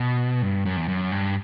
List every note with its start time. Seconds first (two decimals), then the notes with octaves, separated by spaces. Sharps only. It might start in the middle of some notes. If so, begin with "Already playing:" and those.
Already playing: B2
0.42 G2
0.65 F#2
0.77 E2
0.88 F#2
1.12 G2